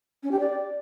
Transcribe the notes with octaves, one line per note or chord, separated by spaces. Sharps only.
C#4
G4
D5